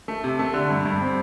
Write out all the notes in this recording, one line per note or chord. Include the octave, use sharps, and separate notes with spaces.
A3
C3
A3
D3
G2
G2
C4